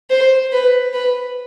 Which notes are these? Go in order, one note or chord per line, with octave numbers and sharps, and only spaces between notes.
C5
B4
B4